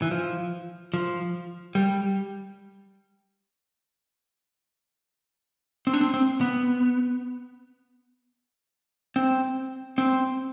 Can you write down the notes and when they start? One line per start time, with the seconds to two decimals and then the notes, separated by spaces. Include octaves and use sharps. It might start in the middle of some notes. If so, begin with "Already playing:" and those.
0.02 E3
0.11 F3
0.94 F3
1.75 G3
5.87 C4
5.94 D4
6.01 C4
6.14 C4
6.41 B3
9.16 C4
9.98 C4